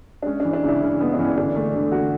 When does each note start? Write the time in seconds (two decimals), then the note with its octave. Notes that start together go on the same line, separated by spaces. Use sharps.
0.23 D4
0.26 G#3 C#4
0.40 D4
0.45 E3
0.53 D4
0.63 C#3 E4
0.81 C#3 C#4
1.00 G#3 B3
1.14 D4
1.19 E3 C#4
1.37 D3 D4
1.55 A3
1.74 D3
1.92 A3 F#4